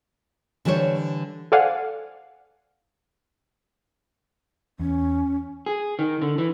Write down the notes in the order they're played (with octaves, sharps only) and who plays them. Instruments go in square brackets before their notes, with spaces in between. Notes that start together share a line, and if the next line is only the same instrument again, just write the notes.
[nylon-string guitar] D3 E3 G3 C5 C#5
[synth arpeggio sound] A4 C5 D5 F5 F#5 G#5
[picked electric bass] E2 [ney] C#4
[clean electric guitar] G#4
D#3
D3
E3